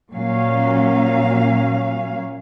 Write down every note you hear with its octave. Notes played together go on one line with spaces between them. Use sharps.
A#2 F#3 C#4 F5